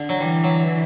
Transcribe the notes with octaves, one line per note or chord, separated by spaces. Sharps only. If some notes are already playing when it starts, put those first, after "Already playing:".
Already playing: D3
F#3
E3 G3
F#3